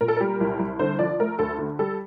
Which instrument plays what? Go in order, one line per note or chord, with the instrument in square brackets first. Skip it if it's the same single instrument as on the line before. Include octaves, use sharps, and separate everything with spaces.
[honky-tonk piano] A#2 A#4
A4
G3 A#4
C2
C2
D3 C5
F3 D5
A3 A#4
D2 A4
D3
G3 A4